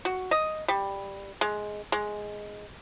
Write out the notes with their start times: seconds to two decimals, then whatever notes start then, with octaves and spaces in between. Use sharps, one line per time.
0.05 F#4
0.31 D#5
0.68 G3
1.41 G#3
1.92 G#3